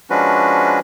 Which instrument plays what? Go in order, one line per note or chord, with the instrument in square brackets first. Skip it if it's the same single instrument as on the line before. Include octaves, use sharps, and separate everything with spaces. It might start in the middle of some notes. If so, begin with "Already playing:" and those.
[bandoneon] F3 G#3 C#4 D4 F#4 B4